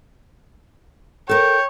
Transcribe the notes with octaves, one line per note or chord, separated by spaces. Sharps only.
A4 A#4 C#5 G5